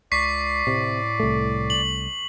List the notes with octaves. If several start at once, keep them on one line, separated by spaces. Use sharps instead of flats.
C#2 D5 C#6 B6 C7
A2 C3
C2 A3
F#7